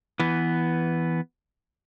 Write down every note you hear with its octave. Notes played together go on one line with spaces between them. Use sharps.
E3 B3